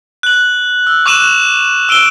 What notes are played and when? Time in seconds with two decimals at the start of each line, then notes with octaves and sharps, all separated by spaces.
0.23 F#6 F#7
0.87 E6
1.06 C#6 D6 F#6 D#7 E7 F#7
1.89 E6 D7 D#7 G7